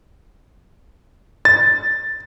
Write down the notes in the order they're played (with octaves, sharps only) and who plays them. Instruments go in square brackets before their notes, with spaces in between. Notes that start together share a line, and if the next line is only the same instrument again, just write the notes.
[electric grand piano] A6